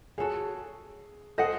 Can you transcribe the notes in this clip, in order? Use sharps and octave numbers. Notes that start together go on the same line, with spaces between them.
F#4 G#4 A4 C#5
G#4 A4 C5 D#5 F#5